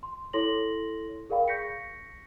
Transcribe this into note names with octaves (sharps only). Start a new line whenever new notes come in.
C6
E4 A4 C#5 C6 A#6 F#7
G#4 A#4 D5 F5 G5 B5
C#6 G6 A#6 B6 C#7